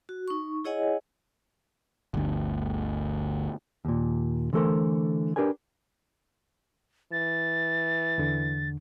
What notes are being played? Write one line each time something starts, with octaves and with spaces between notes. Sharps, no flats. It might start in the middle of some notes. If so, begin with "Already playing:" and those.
F#4
D#4 C#6
E4 G#4 C#5 D#5 F#5 G#5
G1 D2
D#2 A#2
D3 E3 A3 A4 A#4 C5
D4 G4 A#4 B4 G#5
E3 A6
E2 D3